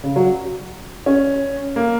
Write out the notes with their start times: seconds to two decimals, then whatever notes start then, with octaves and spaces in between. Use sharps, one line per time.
0.03 C#3
0.16 F#3
1.06 C#4
1.76 A#3